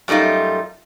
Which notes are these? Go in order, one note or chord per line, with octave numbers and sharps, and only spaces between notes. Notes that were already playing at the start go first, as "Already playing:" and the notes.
F#2 G3 A3 D#4 F4